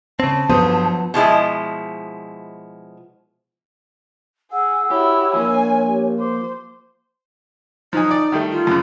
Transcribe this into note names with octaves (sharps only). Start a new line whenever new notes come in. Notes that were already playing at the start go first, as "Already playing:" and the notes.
C#3 C4 A5
G1 F3 F#3 B3 C5 D#6
B2 F3 G#3 E4
G#4 F#5 E6
E4 F#4 G4 C#5
F3 A#3 G#5
G4
C5 D6
F3 F#3 D#4 G#5
D5
D#3 G3 A3
F4
F#2 C#3